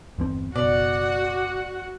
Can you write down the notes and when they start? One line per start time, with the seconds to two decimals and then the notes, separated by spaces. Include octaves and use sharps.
0.18 G1 E2 C4
0.56 F#1 B2 F#4 D5 F#5